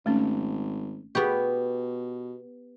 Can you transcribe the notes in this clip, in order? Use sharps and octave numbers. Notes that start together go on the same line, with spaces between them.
G#1 A3 C#4
B2 B3 G4 G#4 C#6